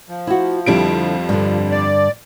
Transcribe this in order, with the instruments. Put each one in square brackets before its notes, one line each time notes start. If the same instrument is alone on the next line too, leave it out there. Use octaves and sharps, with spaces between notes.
[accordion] F3
[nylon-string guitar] E4 F#4
[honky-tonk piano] F2 G3 D7 [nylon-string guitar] D3 C4 E4
[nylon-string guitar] G2 D3
[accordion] D5